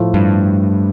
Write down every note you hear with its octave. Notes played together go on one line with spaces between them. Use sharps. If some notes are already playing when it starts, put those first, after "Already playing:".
Already playing: A2 F3 A3
G2